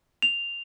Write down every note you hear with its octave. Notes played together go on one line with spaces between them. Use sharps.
F7